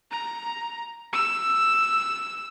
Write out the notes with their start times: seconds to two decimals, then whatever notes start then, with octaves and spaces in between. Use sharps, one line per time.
0.11 A#5
1.13 E6